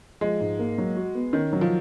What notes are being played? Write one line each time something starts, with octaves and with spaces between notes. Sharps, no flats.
F3 G#3
G#2
A#3
F#3
F#4
B3
D#3 C#4
F#3
F3